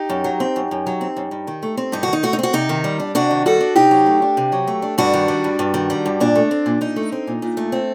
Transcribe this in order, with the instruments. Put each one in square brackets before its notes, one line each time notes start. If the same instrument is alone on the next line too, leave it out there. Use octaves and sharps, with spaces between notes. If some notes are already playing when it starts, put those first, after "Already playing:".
Already playing: [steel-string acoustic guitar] D#4 G4
F#2
F#3
C4
F#2
F#2
F#3
C4
F#2
G2
D#3
A3
C4
G2 D#4
D#3 F#4
D#4
A3 F#4
D#4
C4 F#4
C3 D#4
D#3
G3
D4
C3 D4 F#4
D#3
G3 F#4 A4
D4
C3 D#4 G4
F#3
A3
D4
C3
F#3
A3
D4
G2 D4 F#4
D#3
G3
G2
G2
D#3
G3
G2
A#2 D4
A3
C4
A#2
A#2 D#4
A3
C4
A#2
A#2
A3
C4